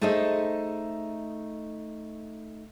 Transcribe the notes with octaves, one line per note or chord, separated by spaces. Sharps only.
A3 D#4 G#4 A4 C5 D#5